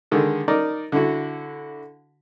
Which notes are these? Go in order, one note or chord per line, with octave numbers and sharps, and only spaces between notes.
D3 D#3 G#3 A4
D#4 A#4 D5
D3 E4 F#4